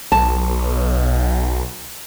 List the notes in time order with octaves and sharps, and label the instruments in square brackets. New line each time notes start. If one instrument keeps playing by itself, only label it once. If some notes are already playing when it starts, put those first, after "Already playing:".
[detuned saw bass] B1 [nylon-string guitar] A5